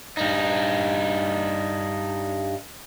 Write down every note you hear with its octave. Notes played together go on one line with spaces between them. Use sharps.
G2 D#4